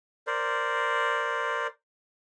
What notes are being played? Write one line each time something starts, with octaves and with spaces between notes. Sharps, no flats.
A#4 C5 D5